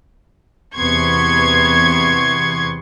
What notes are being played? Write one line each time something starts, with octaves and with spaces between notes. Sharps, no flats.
E2 C3 B3 C6 C#6 G#6